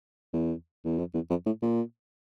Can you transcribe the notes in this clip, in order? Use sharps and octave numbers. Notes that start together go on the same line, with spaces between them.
E2
E2
F2
E2
F2
A2
A#2